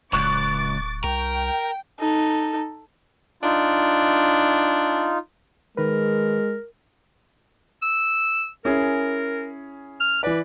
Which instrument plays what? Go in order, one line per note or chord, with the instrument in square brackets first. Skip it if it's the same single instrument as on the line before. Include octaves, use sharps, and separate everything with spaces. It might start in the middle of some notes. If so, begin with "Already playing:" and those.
[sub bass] D1 [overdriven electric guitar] C#2 [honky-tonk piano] C#6 F#6 [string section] D6 A6
[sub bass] C2 [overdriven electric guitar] A#4 [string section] G5
[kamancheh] D#4 A4
[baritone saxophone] D4 [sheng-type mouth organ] D#4 F4
[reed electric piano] D#3 B4 [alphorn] G#3 [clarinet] A#4
[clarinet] E6
[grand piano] C#4 E4 G#4 [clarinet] A#4
[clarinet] F6
[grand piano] E3 D5 [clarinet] B4